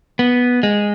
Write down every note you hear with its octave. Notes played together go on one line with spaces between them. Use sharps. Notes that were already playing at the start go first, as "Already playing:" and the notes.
B3
G#3